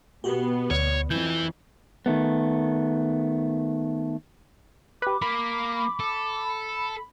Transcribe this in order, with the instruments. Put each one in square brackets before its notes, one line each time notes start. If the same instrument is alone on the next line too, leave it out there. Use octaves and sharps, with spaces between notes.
[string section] B2 B3 [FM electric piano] F#4 G4
[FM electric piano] D2 [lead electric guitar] C#5
[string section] F2 [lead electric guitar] E3 E4 [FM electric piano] G6
[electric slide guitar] D#3 A3 B3
[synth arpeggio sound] G4 B4 [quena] D6
[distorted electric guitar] A#3 A#4 [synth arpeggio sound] B5
[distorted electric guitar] A4